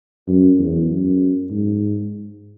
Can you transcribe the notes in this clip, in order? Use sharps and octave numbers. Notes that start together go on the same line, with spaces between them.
F#2
E2
F#2
G#2